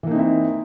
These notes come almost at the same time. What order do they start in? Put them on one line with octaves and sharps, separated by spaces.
E3 A#3 D#4 C4 E4